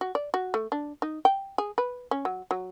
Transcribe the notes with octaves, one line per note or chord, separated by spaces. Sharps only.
F#4
D5
F#4
A3
D4
D#4
G5
G#4
B4
C#4
F#3
F#3